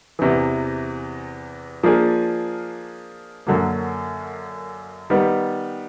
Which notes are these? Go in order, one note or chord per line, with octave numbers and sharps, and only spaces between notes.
E2 C3 E3
F3 A#3 D4 F4 G#4
F#2 D3 F#3 A#3
D#3 G3 B3